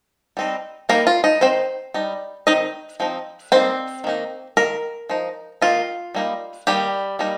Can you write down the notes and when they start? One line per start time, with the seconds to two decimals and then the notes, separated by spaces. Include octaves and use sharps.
0.37 G3 C4 D#4
0.89 G3 A#3 D#4 A#4
1.07 F4
1.24 D#4
1.41 D#3 C4 C5
1.46 D#4
1.94 G3 D#4
2.47 D#3 C4 D#4 D#5
3.00 F3 C4 D#4
3.52 G3 A#3 C4 D#4 C5
4.04 D#3 A#3 D#4
4.57 D#3 A#3 A#4
5.09 F3 D#4
5.62 D#3 A#3 D#4 F4
6.15 G3 A#3 D#4
6.67 D#3 G3 A#3 D#4 G4
7.19 G3 A#3 D#4